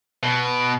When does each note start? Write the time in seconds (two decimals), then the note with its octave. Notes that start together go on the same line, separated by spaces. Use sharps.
0.23 B2